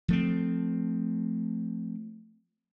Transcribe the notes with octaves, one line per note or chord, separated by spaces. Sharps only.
F3 A3 C4